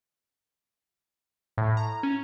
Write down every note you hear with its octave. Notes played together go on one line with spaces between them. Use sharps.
A2
A#5
C#4